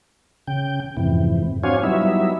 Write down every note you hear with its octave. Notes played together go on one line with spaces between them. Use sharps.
C#3 G5
F2 G#2 C3 E3
C4 D4 F#4 C#5 F5 G#5
F#3 G3 B3 D#4 E4 E5